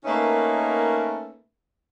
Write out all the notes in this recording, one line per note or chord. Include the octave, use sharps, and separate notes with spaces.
A3 A#3 C#4 D#4 A#4 B4